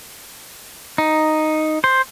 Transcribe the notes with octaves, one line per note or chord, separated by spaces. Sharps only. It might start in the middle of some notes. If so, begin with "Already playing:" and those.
D#4
C5